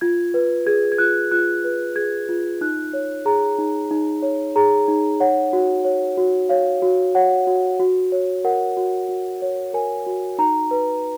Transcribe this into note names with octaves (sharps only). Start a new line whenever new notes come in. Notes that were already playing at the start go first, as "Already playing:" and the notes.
F4 G#6
B4
G#4 G#6
G#6
F4 F#6
F4 F#6
B4
G#4 G#6
F4
D#4 F#6
C#5
G#4 A#5
D#4
D#4
C#5
G#4 A#5
D#4
C#5 F#5
F#4
C#5
F#4
C#5 F5
F#4
C#5 F#5
F#4
F#4
C#5
A#4 F#5
F#4
F#4
C#5
A#4 G#5
F#4
D#4 A#5
B4